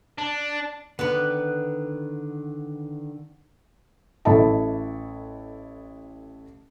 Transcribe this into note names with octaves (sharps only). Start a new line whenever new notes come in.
D4
D3 D#3 B3 B4 D5
A1 E4 A4 D#5 A5